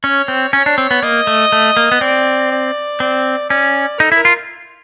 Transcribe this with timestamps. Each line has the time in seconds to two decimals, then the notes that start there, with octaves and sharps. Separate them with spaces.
0.04 C#4 C#5
0.28 C4
0.53 C#4 C#5
0.66 D4
0.78 C4
0.91 B3
1.03 A#3 D#5
1.27 A3
1.52 A3
1.77 A#3
1.92 B3
2.01 C4 D5
2.52 D5
3.00 C4 D5
3.50 C#4 D5
4.00 D#4 A4
4.12 E4
4.16 A#4
4.25 F4